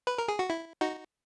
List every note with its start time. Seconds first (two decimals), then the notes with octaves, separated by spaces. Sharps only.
0.07 B4
0.18 A#4
0.28 G#4
0.39 F#4
0.50 E4
0.81 D#4 F#4